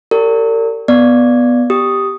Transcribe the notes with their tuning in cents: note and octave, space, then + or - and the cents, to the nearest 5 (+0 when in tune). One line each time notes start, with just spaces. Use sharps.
G4 +5 A#4 -40 D5 -35
B3 +0 D5 +0
G4 +5 D#6 +0